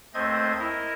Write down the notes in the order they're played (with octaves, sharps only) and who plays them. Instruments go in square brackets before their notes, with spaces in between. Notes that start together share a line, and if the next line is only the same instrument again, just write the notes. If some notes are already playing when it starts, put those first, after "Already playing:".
[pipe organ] D#2 A3 C4 C5 D#5 G#6
E4 A#4 D#5